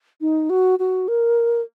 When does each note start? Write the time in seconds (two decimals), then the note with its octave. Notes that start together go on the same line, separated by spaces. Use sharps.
0.21 D#4
0.50 F#4
0.79 F#4
1.08 A#4